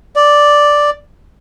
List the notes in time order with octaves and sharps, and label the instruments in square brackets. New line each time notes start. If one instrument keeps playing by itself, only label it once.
[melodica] D5